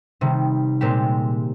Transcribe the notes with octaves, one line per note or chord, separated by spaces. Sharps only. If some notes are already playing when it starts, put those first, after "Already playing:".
C3 D#3 G3
A#2 G#3 C4 G4